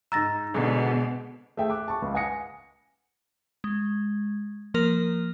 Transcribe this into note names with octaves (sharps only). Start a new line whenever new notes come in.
G#2 A#5 E6 A6 A#6
G#1 B2 D3 G#3
A3 G#4 E5 G5
D6 F#6
A5 C#6
C#2
F#5 G#5 D#6 A#6 C#7
G#3
F3 A#3 A#4